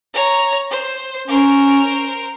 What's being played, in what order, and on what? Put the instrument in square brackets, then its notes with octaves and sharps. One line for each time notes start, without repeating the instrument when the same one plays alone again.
[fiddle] C#5 A#5
C5
[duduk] C#4 [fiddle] A#4 C5